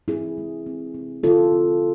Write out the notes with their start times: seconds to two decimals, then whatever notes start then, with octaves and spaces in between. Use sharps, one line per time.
0.08 C4 E4 G#4
0.38 G#3
0.66 C4
0.94 C4
1.23 D3 F4 A4
1.52 C4